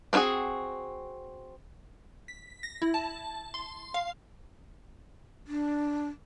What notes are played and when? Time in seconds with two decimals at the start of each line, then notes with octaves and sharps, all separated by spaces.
0.13 C4 C#4 E4 F#4 G#4
2.28 B6
2.63 A#6
2.82 E4
2.94 A5
3.54 C6
3.94 F5
5.47 D4